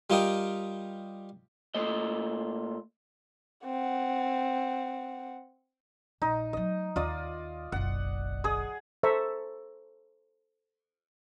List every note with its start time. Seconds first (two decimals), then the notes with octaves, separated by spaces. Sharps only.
0.10 G3 F4 G4 A#4 D#5 G5
1.74 A#2 A3 D#5
3.65 C4 F#5
6.22 A#1 D#4
6.53 F#3 A3 D#5
6.96 D#2 F4 D5 D#5
7.72 F#1 B1 F#5
8.44 G#4 D#6
9.03 A4 C5 E5 A#5 C#6